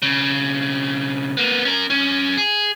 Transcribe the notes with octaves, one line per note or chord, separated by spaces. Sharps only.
B1 C#3
A#3 B3
C#4 A#4
F#2 C#4
G#4